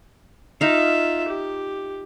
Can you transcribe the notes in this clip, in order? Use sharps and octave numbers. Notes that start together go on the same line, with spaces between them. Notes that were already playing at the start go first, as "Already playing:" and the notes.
D#4 F4 E5 F5
G4